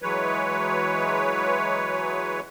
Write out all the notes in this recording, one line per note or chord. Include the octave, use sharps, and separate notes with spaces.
E3 F#3 G#3 B4 C#5